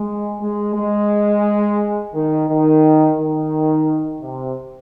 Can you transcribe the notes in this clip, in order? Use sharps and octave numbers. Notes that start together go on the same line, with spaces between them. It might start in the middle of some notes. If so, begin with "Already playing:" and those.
Already playing: G#3
G#3
G#3
D#3
D#3
D#3
C3